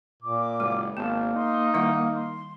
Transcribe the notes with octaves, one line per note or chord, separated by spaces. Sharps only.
A#2 D6
F#1 G#3
G#1 A#3 B3 A5
D#4 C6
D#3 G3 E4 F#5
C6